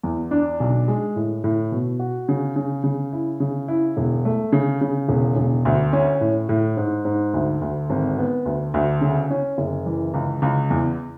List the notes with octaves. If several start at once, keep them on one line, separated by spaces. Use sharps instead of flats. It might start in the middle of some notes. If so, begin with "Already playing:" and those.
E2
D4
B1
G#3
A2
A2
B2
F#4
C#3
C#3
C#3
E4
C#3
E4
E1
A3
C#3
C#3
E1
E1
D2
C#4
A2
A2
G#2
G#2
D2
D2
G#1
B3
D2
D2
C#3
C#4
F#1
E3
C#2
C#2
E2